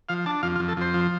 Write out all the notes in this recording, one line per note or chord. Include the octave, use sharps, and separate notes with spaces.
F3 F5
D4 A5
F2 F5
F4
F2
A4
F2 C5
F3